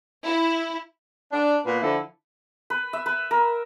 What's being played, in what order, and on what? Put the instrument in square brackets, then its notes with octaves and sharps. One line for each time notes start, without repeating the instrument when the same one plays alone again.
[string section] E4
[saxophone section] D4
A#2 B3 B4
D3 F3 E4 A4
[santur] B4
E5
B4
A#4